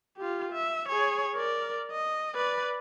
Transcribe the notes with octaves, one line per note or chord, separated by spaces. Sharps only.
F4 G4
E5
G#4 C#5
A#4 D5
D#5
B4 D5